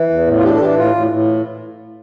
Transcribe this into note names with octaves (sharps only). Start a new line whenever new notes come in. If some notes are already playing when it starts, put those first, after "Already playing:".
Already playing: E3
E2
A2
F4
D4 G4
A4
E3 G4
A2 F4
A2
A2